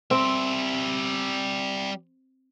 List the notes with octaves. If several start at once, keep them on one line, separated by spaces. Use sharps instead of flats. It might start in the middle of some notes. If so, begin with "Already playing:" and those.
G3 C4 E5